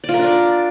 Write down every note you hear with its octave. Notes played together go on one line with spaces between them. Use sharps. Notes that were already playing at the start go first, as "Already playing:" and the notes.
D5
F4
A#4
D4
D5